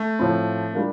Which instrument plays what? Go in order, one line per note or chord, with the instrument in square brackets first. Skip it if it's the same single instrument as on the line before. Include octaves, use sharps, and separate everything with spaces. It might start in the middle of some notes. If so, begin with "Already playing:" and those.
Already playing: [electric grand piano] A3
[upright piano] A2 F3 C4
G3 D4 F4 A#4